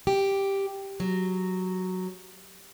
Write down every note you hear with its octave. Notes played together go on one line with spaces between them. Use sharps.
G4
F#3